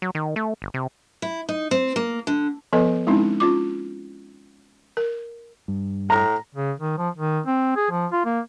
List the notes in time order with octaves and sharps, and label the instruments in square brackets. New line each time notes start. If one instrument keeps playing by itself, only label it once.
[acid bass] F#3
D#3
A3
G1
C3
[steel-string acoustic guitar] E4
D#4
C4
A#3
D3
[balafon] F3 B3 A4 B4 D#5
G#3 C4 C#4 D#4 E4
C#4 F4 D6
A#4
[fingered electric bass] G2
[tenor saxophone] A2 [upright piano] A#5
[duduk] C#3
D#3
F3
D#3
C4
G#4
F3
F4
A#3